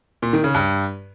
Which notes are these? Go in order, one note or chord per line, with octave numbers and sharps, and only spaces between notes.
A#2
D#3
C#3
G2